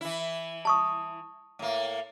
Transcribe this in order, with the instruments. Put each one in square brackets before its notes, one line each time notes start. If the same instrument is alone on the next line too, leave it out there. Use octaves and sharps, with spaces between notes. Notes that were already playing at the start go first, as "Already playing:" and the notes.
[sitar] E3 E4
[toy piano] A5 C#6 D#6
[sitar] A2 A#3